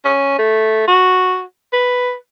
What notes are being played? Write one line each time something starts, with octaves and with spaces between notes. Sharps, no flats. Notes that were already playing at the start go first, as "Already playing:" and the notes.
C#4
A3
F#4
B4